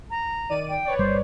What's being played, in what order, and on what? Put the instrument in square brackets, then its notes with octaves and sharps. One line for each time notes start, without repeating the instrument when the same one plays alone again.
[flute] A#5
[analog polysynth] D#3 D5 D#7
[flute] G5
[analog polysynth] B4 C#5 D5
[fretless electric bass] G1 G3 [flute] C5